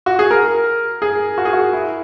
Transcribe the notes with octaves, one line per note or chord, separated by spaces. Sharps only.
F#4
G#4
A#4
G#4
F#4
G#4
F#4
E4